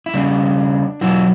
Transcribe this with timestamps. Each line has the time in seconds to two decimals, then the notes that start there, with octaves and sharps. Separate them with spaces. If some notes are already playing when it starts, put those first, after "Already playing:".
0.06 E4
0.14 C#3 G3 D4
1.01 B2 F#3 E4